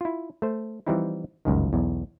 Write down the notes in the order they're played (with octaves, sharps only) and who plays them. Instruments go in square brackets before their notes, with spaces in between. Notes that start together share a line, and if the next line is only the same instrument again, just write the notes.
[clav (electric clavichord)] E4 F4
A3 C5
E3 F3 G3 C4 D#4 E4
G1 C#2 F#2 D#3
B1 E2